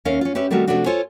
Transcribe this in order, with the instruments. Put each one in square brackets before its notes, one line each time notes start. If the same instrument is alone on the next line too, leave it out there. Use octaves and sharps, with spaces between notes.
[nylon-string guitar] D#2 C#4 A#4 E5 F5
C#4 F4
C#4 G4 B4 E5
D#3 G3 A3 C4 F#4 A#4
C3 D#3 F3 A3 D4 F#4
F4 A4 C5 C#5 G#5